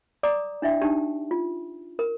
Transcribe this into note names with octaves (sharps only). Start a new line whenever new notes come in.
D5 A#5 D6 D#6
D4 E4 E5 G5
D4 D#4 G4 G5 A5
F4
A#4